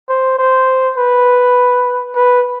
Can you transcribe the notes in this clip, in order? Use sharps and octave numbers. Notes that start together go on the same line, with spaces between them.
C5
C5
B4
B4